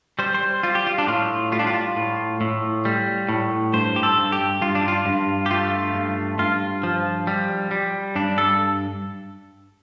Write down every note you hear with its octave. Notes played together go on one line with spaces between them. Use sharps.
G3 C5
C5
G3 F4
G4
F4
D4
A2 F4
G3 F4
D4
F4
A2
A2
G3
A2
G2 C5
G4
A4
G2
G4
G2 F4
D4
F4
G2
G4
A3 F4
G2
G2 F4
F3
G3
G3
G2 D4
A4